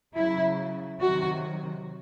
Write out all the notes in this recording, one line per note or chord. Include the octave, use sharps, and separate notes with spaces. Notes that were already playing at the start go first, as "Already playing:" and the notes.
C#3 F#3 E4
C3 D#3 F#3 F#4